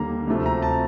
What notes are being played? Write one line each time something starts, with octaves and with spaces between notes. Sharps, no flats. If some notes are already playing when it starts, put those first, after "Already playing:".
Already playing: D#2 D3 G3 A#3 A#5
D2 C3 F3 A3
A#5
A5